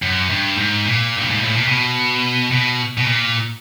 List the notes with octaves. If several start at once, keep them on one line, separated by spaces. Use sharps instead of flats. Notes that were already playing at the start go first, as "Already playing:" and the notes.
F#2
G2
G#2
A#2
G2
G#2
A2
A#2
B2
B2
B2
A#2